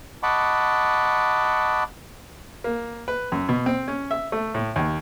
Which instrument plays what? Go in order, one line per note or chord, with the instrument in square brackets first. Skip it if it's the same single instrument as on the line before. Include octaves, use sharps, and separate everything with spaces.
[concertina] D#5 F#5 A5 B5 C#6 D6
[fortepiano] A#3
B4
F#2
B2
C4
C#4
E5
A3
A2
D#2